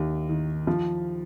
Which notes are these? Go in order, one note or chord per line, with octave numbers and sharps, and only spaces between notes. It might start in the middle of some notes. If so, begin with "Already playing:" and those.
Already playing: D#2
D#3
F3